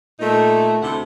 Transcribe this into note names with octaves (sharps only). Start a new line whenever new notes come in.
A#2 A3 D#4
D2 C3 E4 G4 A4 F#5